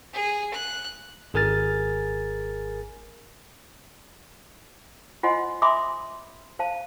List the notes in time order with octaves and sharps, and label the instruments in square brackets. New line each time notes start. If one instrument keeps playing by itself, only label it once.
[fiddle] G#4
F#6
[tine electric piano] G#1 G#4 A#4 G#5 F6 A6
[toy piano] F4 C5 D#5 F#5 G#5 C6
E5 G#5 B5 C6 D6 D#6
C5 F5 A5